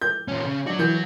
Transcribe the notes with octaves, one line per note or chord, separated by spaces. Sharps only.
G6
A#2 C#4
C#3
F#3 D4 F#4
E3 G6